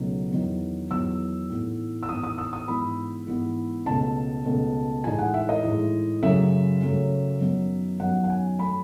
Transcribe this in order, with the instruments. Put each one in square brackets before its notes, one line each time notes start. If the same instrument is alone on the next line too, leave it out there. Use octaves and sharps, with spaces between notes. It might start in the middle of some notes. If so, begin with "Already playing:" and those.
Already playing: [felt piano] C#2 B2 F#3 A3 D#4
E2 D#3 F#3 B3
E2 D#3 F#3 B3 E6
A2 E3 B3 D#4
E6
A2 E3 B3 D#4 D#6
D#6
E6
D#6
G#2 E3 B3 B5
G#2 E3 B3
C#2 B2 A3 A5
C#2 B2 A3
A2 E3 G#3 D#4 G#5
F#5
E5
D#5
A2 E3 G#3 D#4
F#2 C#3 F#3 A3 C#4 E5
F#2 C#3 F#3 A3 C#4
F#2 D#3 F#3 B3 D#4
F#2 D#3 F#3 B3 D#4 F#5
F#5
G#5
F#3 A3 B5